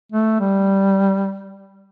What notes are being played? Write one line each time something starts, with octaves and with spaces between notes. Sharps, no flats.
A3
G3